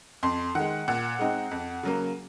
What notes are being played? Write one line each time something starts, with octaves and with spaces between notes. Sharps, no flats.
F2 C6
D#3 G#3 F#5
A#2 F#5
G#3 C4 D#4
F2
C#3 F#3 A#3